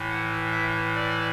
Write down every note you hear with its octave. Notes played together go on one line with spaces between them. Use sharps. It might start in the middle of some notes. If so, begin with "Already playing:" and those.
Already playing: A2 E3
F#5
E5
D5